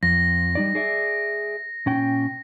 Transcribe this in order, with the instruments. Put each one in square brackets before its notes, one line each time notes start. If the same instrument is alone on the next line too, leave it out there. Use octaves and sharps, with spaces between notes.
[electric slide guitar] F2 [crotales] A#6
[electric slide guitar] G3 D#4 D5
G#4 D5 E5
A#2 C#4 G5